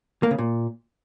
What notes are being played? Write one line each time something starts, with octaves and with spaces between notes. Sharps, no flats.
A#3
C#3
A#2